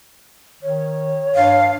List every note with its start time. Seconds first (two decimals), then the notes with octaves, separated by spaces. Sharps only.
0.62 D#3 C#5
1.35 G2 F5